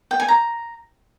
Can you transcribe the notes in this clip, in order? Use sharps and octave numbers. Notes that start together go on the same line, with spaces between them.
G5
G#5
A#5